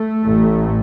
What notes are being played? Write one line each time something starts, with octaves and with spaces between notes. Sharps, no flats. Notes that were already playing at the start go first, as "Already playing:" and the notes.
Already playing: A3
A1 A2